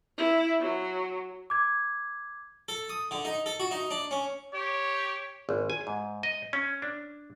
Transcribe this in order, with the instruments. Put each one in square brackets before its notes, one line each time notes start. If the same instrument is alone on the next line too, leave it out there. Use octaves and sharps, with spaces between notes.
[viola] E4
F#3
[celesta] D6 G#6
[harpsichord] A4
D#6
D3
D#4
A4
F#4
D#4
D4
C#4
[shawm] G4 [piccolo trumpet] C#5
[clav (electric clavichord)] G#1
G#5
G#2
D#5
C#4
D4